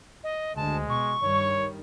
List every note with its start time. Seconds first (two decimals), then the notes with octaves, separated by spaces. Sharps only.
0.24 D#5
0.56 D2 G#3 A5
0.90 B2 C#6
1.23 G2 D#3 G3 C#5